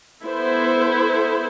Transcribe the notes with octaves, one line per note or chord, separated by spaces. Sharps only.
B3 E4 A4 C5